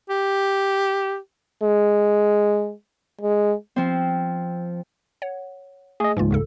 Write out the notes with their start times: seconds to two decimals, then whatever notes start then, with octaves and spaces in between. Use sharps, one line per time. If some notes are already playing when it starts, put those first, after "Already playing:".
0.10 G4
1.63 G#3
3.21 G#3
3.76 F3 C4
5.22 C#5 F#5
6.00 A3 G#4 D#5
6.17 C#2 G#2 E3 A#3 F4
6.31 D#2 C#3 A4